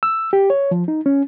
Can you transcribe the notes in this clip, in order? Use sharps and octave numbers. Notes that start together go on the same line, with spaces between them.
E6
G4
C#5
F3
D#4
C#4